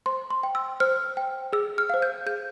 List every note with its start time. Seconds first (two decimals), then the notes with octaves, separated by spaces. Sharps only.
0.06 C5 C6
0.30 C6
0.43 G5
0.55 E6
0.80 C5 F6
1.17 G5
1.53 G#4 E6
1.78 F6
1.90 C5 F5
2.02 G6
2.26 G#4 G6